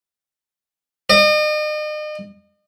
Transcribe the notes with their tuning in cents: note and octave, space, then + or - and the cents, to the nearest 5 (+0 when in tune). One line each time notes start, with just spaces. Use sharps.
D#5 -40